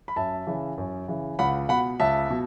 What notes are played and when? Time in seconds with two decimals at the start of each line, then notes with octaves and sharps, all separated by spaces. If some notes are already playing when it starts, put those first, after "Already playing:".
0.08 B5
0.16 F#2 E5 A5
0.47 C#3 E3
0.78 F#2
1.08 C#3 E3
1.39 C#2 F#5 B5
1.69 B2 F#5 B5
2.00 C#2 E5 A5
2.30 B2